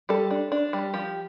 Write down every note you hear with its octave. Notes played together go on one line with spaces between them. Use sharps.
G3 A4
D4
D4
G3
F3 G4